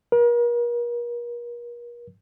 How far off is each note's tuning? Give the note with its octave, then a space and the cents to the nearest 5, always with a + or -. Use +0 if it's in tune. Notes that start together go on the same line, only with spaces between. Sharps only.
A#4 +40